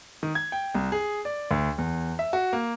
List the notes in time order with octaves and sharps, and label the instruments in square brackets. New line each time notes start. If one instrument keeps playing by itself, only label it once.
[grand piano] D#3
G#6
G5
C2
G#4
D5
D2
E2
E5
F#4
A#3